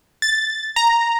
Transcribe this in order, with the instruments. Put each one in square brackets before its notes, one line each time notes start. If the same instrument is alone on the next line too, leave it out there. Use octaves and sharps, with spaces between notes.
[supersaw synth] A6
A#5